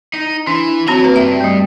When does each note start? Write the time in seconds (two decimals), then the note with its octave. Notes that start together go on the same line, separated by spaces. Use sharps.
0.13 D#4
0.47 E3 D4
0.88 C4 F#4 C#5 A#5 B5
1.05 A#3 B4
1.16 G2 E5
1.41 G3 A3